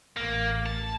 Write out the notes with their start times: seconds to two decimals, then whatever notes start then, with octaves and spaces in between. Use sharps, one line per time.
0.17 A1 A#3
0.66 A5